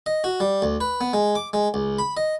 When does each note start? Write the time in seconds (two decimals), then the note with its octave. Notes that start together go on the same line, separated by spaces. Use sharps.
0.06 D#5
0.24 F#4
0.40 G3
0.62 D2
0.81 B4
1.01 B3
1.13 G#3
1.35 D6
1.53 G#3
1.74 C#2
1.99 B5
2.17 D#5